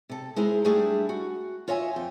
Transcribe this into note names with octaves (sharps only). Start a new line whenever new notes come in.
C3 A4
G#3 E4 G#4 C5 A#5
G3 A3 D4 E4 G#4
F#4
F4 C#5 D#5 E5 G#5
F2 G5